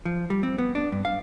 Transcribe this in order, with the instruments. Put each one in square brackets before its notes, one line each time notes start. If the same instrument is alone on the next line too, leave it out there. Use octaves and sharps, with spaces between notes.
[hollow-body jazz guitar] F3
G3
C4
B3
D4
G2
F5